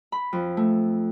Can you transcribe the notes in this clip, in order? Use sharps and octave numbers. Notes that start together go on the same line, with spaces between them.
B5
F2
A3